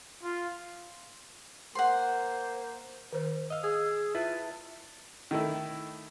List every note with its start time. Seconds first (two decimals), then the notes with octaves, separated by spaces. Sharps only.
0.23 F4
1.75 A#3 C5 F#5 C6
3.13 D#3 C5
3.50 D#5 F5 E6
3.64 G#4
4.15 E4 F4 B4 A5
5.31 D#3 A3 E4